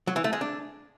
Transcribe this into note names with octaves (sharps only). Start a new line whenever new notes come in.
F#3
E3
A3
G#3
D4